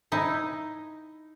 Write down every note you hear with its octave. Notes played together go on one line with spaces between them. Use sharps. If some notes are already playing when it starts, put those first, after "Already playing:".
D#4 E4